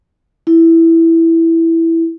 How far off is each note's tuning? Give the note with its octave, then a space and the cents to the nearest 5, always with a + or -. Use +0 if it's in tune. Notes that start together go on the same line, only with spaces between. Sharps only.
E4 +0